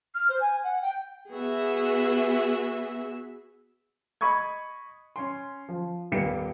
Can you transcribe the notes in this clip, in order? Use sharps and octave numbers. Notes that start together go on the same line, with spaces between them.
F6
C5
G#5
F#5
G5
B3 F#4 G#4 E5
D#5 B5 C#6 D#6 G#6
C#4 C6
F3
D#1 A#2 A#3 B3 G4 C#7